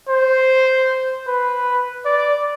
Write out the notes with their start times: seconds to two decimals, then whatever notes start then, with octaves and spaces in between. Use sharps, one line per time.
0.09 C5
1.27 B4
2.05 D5